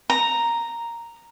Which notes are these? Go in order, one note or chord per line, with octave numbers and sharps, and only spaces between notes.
A#5